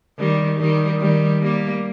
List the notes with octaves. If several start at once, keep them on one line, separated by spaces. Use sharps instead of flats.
D#3 G3
D#3 G3
D#3 G3
G3 A#3